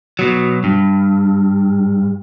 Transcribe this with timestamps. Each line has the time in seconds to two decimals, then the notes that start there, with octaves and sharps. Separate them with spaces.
0.19 B2 F#3
0.64 G2